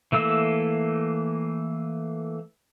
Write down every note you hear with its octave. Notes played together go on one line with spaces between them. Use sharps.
E3 A3 A#3 E6